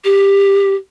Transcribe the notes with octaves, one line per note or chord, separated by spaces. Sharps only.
G4